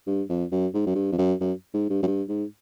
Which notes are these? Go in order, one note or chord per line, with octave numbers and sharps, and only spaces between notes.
G2
F2
F#2
G#2
F#2
G2
F2
F#2
F#2
G#2
G2
F#2
G2
G#2